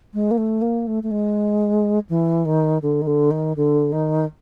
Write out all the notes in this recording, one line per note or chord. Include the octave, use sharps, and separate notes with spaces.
G#3
A#3
A3
A#3
A3
A3
G#3
E3
D#3
D3
D#3
D3
D#3
D3
D#3